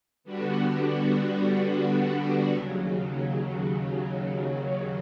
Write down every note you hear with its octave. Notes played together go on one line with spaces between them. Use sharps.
D3 G3 B3 D4 F#4
D#2 C#3 F#3